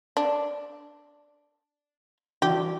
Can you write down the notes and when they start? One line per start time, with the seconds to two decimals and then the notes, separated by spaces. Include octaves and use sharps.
0.17 D4
2.42 E3 D4 F#4 G4